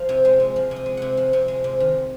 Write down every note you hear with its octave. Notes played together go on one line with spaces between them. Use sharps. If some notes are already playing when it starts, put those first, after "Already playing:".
Already playing: F3 F5
C3
G#3
C3
F3
C3
D#5
G#3
C3 F#5
F3
C3
G#3
C3
D#3